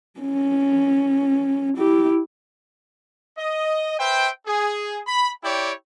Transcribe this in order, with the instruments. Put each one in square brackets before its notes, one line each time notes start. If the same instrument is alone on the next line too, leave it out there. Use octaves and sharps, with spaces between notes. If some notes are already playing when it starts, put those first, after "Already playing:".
[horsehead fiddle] C#4
E4 G4
[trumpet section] D#5
B4 C5 E5 G5
G#4
B5
E4 G4 C#5 D5 G5